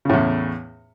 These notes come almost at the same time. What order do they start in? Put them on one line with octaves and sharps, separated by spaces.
C#3 A2 E2